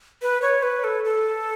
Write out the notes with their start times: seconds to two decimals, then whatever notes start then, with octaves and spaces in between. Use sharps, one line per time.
0.22 B4
0.42 C#5
0.63 B4
0.84 A4
1.05 A4